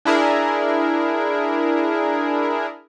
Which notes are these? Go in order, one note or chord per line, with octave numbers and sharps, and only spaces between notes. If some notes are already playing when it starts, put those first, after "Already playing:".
D4 E4 G#4 A#4